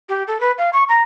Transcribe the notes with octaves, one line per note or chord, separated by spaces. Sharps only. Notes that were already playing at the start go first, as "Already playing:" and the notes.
G4
A4
B4
F5
C#6
A#5